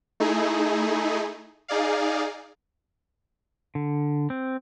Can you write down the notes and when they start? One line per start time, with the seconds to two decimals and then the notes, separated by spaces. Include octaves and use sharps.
0.20 A3 D#4 E4 G#4
1.68 D#4 G#4 D5 F5
3.75 D3
4.30 C4